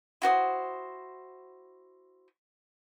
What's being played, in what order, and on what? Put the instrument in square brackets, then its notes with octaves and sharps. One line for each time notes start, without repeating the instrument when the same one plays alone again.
[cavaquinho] E4 F#4 C5 D#6